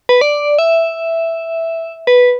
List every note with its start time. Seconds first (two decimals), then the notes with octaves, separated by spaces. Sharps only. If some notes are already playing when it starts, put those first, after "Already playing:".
0.09 B4
0.21 D5
0.59 E5
2.07 B4